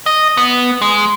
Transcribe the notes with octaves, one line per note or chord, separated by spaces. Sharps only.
D#5
B3
G#3